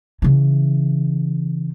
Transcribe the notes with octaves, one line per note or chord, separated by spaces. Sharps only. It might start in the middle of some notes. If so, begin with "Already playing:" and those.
C#3 E3